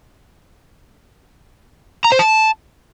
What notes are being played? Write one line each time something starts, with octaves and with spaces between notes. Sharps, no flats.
A#5
C5
A5